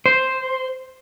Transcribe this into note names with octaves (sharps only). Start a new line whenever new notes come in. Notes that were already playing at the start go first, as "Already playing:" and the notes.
C5